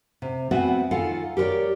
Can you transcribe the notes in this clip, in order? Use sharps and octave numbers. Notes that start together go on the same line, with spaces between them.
C3
B3 C4 F#4 B4 E5 G#5
D#3 F4 A4 F5 F#5 G#5
G4 A#4 B4 C#5 D5